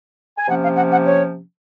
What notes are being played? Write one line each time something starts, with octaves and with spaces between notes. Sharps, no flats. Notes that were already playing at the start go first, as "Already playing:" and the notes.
G#5
C3 F3 A#3 C#4 F#5
F5
F#5
F#5
C#5